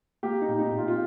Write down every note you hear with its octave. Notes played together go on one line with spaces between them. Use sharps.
A#3 G4
D#4
A#2
D#4
A#2
F4
F4